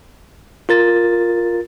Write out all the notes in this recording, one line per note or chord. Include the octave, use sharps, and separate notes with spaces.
F4 A#4 A6